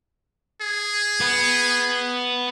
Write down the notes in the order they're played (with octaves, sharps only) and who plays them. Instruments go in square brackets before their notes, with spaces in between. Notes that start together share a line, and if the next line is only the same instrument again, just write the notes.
[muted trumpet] G#4
[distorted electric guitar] B3